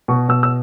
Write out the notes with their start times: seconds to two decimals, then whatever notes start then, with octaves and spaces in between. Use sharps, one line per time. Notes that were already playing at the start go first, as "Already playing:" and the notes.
0.08 B2 C#6
0.29 B2 E6
0.43 E6